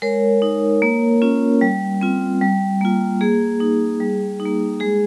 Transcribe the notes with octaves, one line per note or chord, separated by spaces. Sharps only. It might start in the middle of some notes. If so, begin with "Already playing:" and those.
G#3 A#4 C#5
D#4
A#3
C#4 F4
G3
C4 F4
G3
A#3 F4
A#3 G#4
D#4
G3
D#4
A#3
G#3 G#4